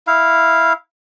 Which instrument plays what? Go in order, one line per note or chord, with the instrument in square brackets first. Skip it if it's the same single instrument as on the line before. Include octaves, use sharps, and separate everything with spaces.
[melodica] E4 F5